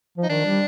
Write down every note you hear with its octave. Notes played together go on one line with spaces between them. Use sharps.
F3
D#4
D#3 D4
G3